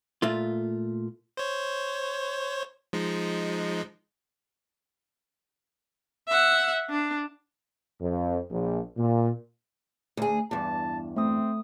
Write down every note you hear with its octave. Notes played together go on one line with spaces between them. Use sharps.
A#2 A3 F4
C5 C#5
F3 G#3 D#4
E5 F#5
D4
F2
A#1
A#2
D2 G#4
E2 G2 A5
A3 C4 D#6